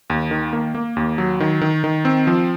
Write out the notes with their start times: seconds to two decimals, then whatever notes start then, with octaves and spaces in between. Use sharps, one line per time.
0.10 D#2
0.31 D#3
0.53 A#3
0.75 A#3
0.96 D#2
1.18 F#3
1.40 D#3
1.61 D#3
1.84 D#3
2.05 C4
2.27 F3